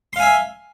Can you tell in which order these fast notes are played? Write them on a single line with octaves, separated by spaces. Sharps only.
C6 F5 G#5 E5